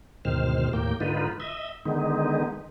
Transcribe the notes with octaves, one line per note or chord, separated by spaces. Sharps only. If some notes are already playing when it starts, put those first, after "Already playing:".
D2 G#2 B2 D#3 C5 F6
D#2 A2 A#3 G5
G#2 D3 D#4 F4 B4
D#5 E5
D3 D#3 G#3 B3 D#4